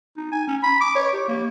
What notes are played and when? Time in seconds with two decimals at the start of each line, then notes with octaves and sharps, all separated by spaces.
0.17 D#4
0.32 G#5
0.48 C#4
0.63 B5
0.81 D6
0.95 C#5
1.13 G4
1.28 A#3